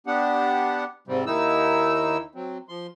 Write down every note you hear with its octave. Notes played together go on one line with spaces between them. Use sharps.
B3 D4 G4 F#5
G#2 C3 G3 C4
D#2 D#3 D#4 E4 E6
F#3 C4
F3 C6